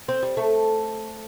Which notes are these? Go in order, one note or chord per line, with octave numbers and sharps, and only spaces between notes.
C4
G3
A3